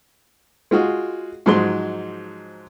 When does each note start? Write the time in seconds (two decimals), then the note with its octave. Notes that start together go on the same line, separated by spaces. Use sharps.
0.71 G#3 F4 F#4 G#4
1.46 G#2 F3 F#3 G#3 D#4 C6